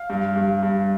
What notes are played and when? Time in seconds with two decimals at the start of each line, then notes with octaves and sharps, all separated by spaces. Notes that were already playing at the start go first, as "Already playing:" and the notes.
Already playing: F5
0.10 G2
0.36 G2
0.63 G2